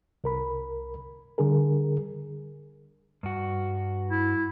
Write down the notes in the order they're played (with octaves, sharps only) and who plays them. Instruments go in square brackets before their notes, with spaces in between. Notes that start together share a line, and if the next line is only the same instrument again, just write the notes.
[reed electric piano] C2 A#4 B5
D3 G3 G#4 A#4
[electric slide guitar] G2 F#4
[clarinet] E4